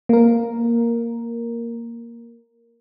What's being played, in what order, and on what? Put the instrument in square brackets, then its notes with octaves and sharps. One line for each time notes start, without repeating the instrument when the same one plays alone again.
[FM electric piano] A#3 A#4